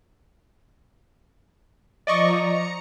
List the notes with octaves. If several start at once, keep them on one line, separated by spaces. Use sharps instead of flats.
F3 D5 D#5 A#5 C#6
A#5 C#7